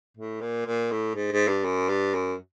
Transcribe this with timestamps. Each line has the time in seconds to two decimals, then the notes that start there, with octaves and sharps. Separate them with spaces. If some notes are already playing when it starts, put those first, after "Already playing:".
0.17 A2
0.41 A#2
0.66 A#2
0.91 A2
1.16 G#2
1.32 G#2
1.48 G2
1.64 F#2
1.89 G2
2.14 F#2